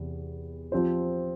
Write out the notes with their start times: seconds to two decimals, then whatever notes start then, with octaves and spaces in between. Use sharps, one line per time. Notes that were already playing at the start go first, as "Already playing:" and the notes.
Already playing: E2 C3
0.72 F3 C4 G4 C5